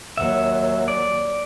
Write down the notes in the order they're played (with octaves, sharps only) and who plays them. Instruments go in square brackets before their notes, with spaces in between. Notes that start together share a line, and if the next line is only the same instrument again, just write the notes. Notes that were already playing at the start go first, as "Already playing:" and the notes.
[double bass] D#2 F#3 [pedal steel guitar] E5 F#5
[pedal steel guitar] D5